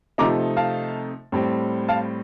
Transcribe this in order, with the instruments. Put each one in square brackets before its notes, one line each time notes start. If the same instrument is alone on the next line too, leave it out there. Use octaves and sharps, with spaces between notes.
[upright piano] C3 F3 A3 D#4 A#5 D6
F5 A5
A2 G3 C4
F5 A5